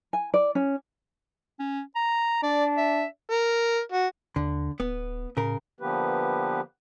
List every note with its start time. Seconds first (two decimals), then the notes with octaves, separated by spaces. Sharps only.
0.13 G#5
0.34 D5
0.55 C#4
1.59 C#4
1.96 A#5
2.43 D4 D5
2.77 E5
3.30 A#4
3.92 F#4
4.36 D#2 D3
4.80 D1 B3
5.37 A2 C#3 A#4
5.80 D3 F3 A#3 B3 G4 B4